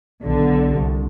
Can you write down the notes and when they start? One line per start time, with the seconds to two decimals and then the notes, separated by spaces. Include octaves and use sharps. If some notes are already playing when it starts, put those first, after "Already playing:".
0.22 B1 D3
0.74 C2